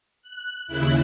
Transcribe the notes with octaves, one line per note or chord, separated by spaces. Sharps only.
F#6
D#2 C#3 E4 F#6